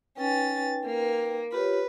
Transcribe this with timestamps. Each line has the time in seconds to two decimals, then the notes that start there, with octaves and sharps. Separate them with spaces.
0.17 C#4 D#4 B4 G5 A6
0.85 A#3
1.52 F4 G4 B4 C#5